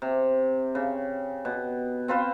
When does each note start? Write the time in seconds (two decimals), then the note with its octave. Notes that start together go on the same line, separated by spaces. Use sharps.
0.02 C3
0.75 C#3
1.45 B2
2.08 C4 F4 B4 C5